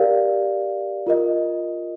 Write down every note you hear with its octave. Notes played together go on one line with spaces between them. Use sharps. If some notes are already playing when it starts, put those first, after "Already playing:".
Already playing: G4 A#4 D5 F5
F4 A#4 D#5